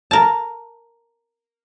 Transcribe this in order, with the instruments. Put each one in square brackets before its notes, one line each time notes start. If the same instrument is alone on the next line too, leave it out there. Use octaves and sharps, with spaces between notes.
[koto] A#4 A5